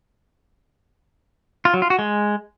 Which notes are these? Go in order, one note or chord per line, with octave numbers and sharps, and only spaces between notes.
F4
F#3
F4
F#4
G#3